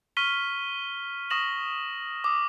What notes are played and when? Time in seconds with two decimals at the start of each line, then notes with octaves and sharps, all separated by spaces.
0.17 C#6 F6 B6 D#7 G7
1.30 C#6 D#6 A#6 E7 F#7
2.24 D6 D#6